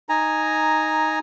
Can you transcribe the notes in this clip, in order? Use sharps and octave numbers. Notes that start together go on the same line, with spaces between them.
D#4 G#5 A#5